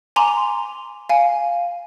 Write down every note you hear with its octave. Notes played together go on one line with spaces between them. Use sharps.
G#5 A#5 C6 D6 F7
F5 G#5